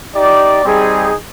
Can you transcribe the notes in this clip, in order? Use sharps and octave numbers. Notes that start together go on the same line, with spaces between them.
D#4 G4 D5
G3 C4 D#4 G#4